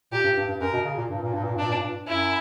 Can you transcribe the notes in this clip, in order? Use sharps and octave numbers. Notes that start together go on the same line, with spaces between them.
A#2 G4
G2
G2
G2
F#2 A#4
B2
C#3
A#2
G2
A#2
G2
A#2
G2 D4
A#2
G2
F#2 E4